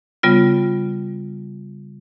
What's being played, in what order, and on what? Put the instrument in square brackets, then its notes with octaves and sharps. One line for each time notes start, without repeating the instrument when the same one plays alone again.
[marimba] C#3 G3 B3 F4